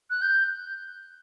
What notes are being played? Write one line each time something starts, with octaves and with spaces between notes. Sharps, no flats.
F#6
G6